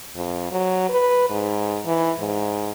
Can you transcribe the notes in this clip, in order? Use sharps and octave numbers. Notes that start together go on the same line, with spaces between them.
F2
F#3
B4
G#2
E3
G#2